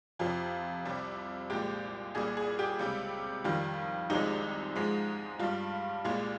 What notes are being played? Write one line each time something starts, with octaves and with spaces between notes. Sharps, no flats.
F2 C3 F3 F4
C2 C3 G3
C2 A#2 F3 G#3 G4
C2 A#2 G3 G#4
G#4
G4
C#2 C3 G3
F2 D#3 G3 F4
C2 C3 F3 G#3 D#4
G#2 F3 G#3
G2 G3 F4
C2 A#2 G#3 F4